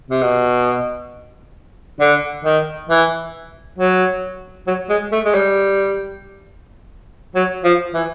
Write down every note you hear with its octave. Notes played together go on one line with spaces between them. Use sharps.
C3
B2
D3
D#3
E3
F#3
F#3
G#3
A3
G#3
G3
F#3
F3
E3